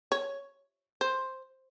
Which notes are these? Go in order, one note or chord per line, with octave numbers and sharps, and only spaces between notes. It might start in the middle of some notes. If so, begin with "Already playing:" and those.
C#5
C5